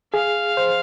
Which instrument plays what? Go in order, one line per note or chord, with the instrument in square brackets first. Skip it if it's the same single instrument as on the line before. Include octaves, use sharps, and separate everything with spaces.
[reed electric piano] G#4 [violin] F5
[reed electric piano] C5